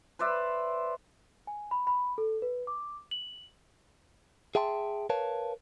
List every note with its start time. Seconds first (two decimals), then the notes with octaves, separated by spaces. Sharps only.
0.19 B4 C5 D5 E5
1.47 G#5
1.71 B5
1.87 B5
2.18 A4
2.42 B4
2.67 D6
3.11 F#7
4.55 G#4 E5 G5 A5 C6
5.10 A#4 B4 C#5 F5 A5